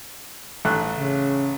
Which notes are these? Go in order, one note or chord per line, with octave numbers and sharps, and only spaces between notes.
A1 A3 F#6
C#3